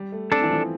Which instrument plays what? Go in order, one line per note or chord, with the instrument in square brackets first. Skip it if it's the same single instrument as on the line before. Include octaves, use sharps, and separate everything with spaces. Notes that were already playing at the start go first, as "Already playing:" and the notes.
Already playing: [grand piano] G3
A3
[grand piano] C4 [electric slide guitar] D4 A4
[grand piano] E3
F3